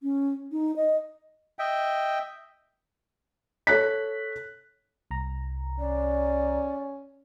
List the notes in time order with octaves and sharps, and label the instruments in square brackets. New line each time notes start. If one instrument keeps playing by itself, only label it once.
[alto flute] C#4
D#4
D#5
[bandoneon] D#5 E5 G5
[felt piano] A4 C#5 F#6 B6
[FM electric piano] C2 A#5
[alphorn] C#4 [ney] D5